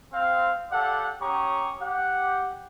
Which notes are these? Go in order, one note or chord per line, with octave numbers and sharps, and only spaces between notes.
C4 F5
G4 A4 D5 F5 F#5
C#4 G4 C#5 A#5 C#6 D#6
G4 F#5